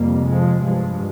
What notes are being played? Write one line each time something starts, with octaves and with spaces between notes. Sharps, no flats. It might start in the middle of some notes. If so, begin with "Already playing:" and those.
Already playing: F2 C3 G3 A#3
F3 G#3
G2 F3 G#3